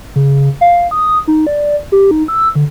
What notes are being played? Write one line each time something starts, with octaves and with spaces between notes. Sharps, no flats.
C#3
F5
D#6
D#4
D5
G4
D#4
E6
D3